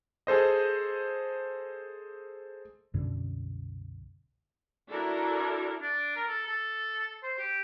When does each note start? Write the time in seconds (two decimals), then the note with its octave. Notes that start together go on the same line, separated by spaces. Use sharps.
0.27 G#4 A4 C5 D#5
2.94 C2 F#2 B2 D3
4.89 D4 E4 F#4 A4 A#4
5.82 D4
6.16 A#4
6.28 A4
6.46 A4
7.23 C5
7.39 G4